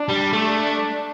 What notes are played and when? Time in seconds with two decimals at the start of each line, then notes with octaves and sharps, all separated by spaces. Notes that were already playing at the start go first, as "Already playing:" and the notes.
Already playing: D4
0.08 G3
0.33 A3